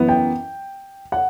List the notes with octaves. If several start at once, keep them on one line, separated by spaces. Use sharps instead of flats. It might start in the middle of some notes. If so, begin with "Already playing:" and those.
Already playing: F#2 E3 B3
G5
F#5